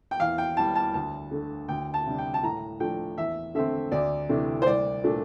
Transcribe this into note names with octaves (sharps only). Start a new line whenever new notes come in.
G5
E2 F5
G5
E3 G3 A5
A5
D2 A5
D3 A3
D2 G5
A5
C3 G3 D4
G5
A5
A2 A#5
F3 A3 D4 G5
E2 E5
D3 A3 C4 E5
D2 D5
C3 E3 A3 D4
C5
C2 D5
A#2 A3 D4